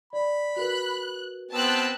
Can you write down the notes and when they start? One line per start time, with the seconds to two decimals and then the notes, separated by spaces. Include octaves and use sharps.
0.13 D5 B5
0.56 F#4 A#4 B4 F#6
1.51 B3 C4 A5 E6 F#6